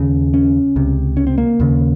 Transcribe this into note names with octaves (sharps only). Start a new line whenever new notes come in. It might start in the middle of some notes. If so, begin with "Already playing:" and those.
Already playing: D#2 C#3
C#4
C#2 C3
C#4
C4
A#3
D#2 C#3